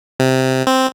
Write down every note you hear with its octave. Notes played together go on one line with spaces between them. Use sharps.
C3
C4